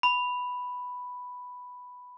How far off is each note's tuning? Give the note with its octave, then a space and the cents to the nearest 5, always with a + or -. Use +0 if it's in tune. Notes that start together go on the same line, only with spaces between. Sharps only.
B5 +0